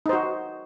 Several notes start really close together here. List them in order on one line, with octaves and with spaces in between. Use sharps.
D#4 C5 F#4